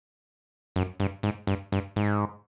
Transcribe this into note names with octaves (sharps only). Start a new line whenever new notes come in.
F#2
G2
G#2
G2
G2
G#2